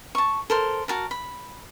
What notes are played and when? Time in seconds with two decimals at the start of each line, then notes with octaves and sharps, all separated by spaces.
0.15 A5 C#6
0.50 A4 A#4 C5
0.88 F#4 A#4 A5
1.11 B5